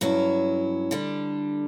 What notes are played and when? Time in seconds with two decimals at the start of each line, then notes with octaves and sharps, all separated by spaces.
0.01 G2 F#3 C#4 E4
0.91 D3 G3 D4